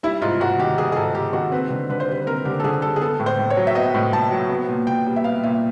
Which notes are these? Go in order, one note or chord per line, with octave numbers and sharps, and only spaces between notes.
G3 E4
G#2 F4
G#2 F#4
D#3 G4
G3 G#4
G#4
G#2 A4
G#2 G4
D#3 F#4
C4 B4
D3
D3 B4
C5
G3 B4
C4 A#4
D3 G4
A4
D3 G#4
G3 A4
G#4
B3 A4
A2
C5
A2
C#5
F#3
E5
B3 D#5
A2
A2 A5
F#3
B3
A#2
A#2 G5
G3
E5
B3 F5
A#2 E5